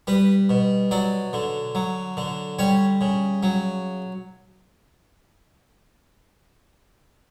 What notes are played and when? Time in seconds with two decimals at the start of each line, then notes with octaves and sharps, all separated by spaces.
0.07 G3 B4
0.50 B2
0.91 F#3 D5
1.33 D3
1.75 F#3
2.17 D3
2.59 G3 C#5
3.01 C#3
3.43 F#3